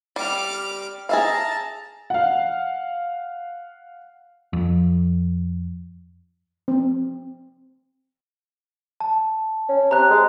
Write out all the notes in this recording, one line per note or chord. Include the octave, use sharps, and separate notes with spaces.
G3 D6 F6
G#4 E5 F5 A5 A#5
F5 F#5
F2
C4
A5
C#4
C3 A#5 F#6
G#3